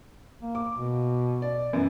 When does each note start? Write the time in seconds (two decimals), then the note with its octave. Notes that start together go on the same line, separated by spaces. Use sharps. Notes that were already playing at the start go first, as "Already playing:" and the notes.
0.42 A#3
0.55 D6
0.76 B2
1.42 D5
1.73 F#2 E3